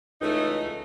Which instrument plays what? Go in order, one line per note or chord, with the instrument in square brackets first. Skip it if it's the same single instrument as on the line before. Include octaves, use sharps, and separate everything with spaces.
[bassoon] C#2 [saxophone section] E3 D#4 [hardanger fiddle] A3